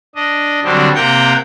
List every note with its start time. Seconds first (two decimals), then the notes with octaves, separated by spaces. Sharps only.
0.15 D4 D#5
0.64 D3 F#3 G3 C4 D4
0.95 C3 A#3 A#4 F#5 G5 G6